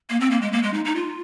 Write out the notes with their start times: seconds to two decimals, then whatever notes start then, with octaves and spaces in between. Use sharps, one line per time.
0.10 A#3
0.20 C4
0.31 A#3
0.41 G#3
0.52 A#3
0.63 G#3
0.74 D#4
0.85 D#4
0.96 F4